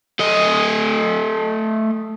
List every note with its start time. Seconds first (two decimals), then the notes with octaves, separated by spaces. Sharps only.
0.20 A3 D#5